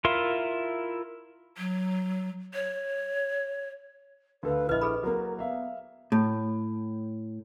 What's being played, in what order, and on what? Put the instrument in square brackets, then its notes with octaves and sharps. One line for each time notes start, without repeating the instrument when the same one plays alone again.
[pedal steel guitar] E4 F4 A#4 E5 C6
[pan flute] F#3
C#5
[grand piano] D2 A4 F5 [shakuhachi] B4
[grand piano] A#1 F6 [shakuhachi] E4 [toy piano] B4 D#5
[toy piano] G#4 A4 B5
[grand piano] F#3 A#3 [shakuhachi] A#4
[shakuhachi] B3 [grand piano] E5 F5
[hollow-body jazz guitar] A2